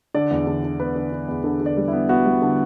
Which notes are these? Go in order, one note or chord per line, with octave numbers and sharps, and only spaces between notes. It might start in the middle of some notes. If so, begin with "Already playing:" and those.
D3 D5
E2
D3
D3
B3 B4
D3
D3
E2
D3 A4
D3
D5
G3
E4
B3
B3 F#4
G3
D3